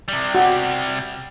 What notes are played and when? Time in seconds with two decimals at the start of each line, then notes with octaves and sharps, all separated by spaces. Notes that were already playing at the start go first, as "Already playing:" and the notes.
0.08 C3 G3
0.35 F#4